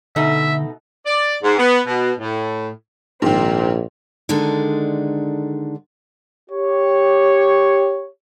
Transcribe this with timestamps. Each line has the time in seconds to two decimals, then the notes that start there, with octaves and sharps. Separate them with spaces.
0.16 B2 D3 A3 D#4 E5
1.05 D5
1.43 G#2
1.58 B3
1.86 B2
2.19 A2
3.22 A#1 G#2 D#3 C4
4.29 D3 D#3 G#3 D4 A4
6.51 G4 C#5